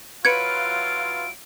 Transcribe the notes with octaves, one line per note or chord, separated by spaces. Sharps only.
F#3 E4 F4 B4 C#5 G#6 C#7 D7